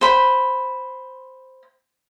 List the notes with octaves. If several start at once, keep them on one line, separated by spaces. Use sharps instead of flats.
C5 B5